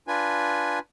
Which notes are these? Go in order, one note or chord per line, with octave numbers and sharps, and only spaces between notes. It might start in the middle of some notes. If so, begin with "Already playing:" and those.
D4 F4 B4 G#5